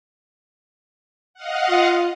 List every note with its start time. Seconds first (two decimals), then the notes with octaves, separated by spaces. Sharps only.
1.34 D#5 F5 F#5
1.69 F4